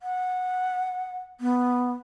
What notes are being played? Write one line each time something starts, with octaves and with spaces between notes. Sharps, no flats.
F#5
B3